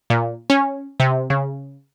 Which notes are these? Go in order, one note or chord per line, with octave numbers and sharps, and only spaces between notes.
A#2
C#4
C3
C#3